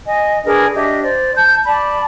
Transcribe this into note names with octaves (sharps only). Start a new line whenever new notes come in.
D#5 G#5
D4 G#4 A#4 B4
D4 G4 D#5 E5
C5 D5
A5 G6
D5 A5 B5